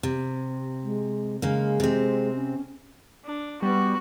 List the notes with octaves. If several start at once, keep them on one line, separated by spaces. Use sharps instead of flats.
C3
G#3
C#3 G#3 A#3
C3 C4
C#4
D4
G3 B3 F#4